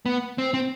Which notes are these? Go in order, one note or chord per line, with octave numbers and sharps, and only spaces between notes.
B3
C4
C4